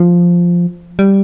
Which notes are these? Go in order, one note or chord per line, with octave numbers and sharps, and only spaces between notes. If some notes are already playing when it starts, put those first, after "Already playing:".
Already playing: F3
G3